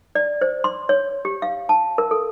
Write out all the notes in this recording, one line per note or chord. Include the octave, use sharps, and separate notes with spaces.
D5
C5
C6
C#5
G4
F5
A5
A#4
A4